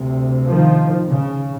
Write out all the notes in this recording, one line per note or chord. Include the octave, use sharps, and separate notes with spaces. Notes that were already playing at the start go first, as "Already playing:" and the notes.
Already playing: D2 C3
D#3 F3
C#3